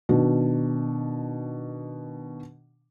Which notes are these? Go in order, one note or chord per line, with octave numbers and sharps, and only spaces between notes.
B2 D#3 D4 F#4